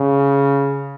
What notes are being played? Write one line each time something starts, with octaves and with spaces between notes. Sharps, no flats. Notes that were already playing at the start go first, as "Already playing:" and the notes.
Already playing: C#3